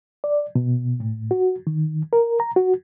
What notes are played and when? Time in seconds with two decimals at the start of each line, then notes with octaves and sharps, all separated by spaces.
0.24 D5
0.55 B2
1.00 A2
1.31 F#4
1.67 D#3
2.13 A#4
2.40 A#5
2.56 F#4